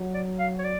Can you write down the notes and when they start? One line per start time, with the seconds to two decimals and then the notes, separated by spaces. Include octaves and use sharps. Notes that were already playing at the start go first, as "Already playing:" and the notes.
Already playing: F#3
0.14 D5
0.39 F5
0.59 C#5
0.64 D5